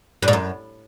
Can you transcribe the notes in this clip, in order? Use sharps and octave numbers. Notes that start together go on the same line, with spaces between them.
G2
G#2
F#2